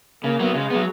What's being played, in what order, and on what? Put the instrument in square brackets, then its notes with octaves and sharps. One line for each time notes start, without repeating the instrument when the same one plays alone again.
[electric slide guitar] C#3 [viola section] A#3 A#4
[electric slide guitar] F#3 B3
[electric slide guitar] C#3 [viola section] G#3 G#4
[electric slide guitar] F#3 B3